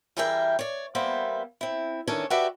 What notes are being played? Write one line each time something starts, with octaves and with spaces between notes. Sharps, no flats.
E3 G3 G#4 A#4 E5 G5
C#5 D5
G3 A#3 B3 C5 E5
C4 E4
D#3 E3 C#4 D4 A4 C#5
F#4 G4 A4 B4 D5 E5